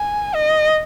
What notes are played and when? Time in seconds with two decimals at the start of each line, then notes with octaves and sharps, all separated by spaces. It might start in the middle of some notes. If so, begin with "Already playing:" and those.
Already playing: G#5
0.35 D#5